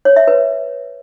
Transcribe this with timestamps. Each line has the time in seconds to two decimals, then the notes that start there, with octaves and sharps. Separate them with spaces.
0.05 C#5
0.16 E5
0.28 B4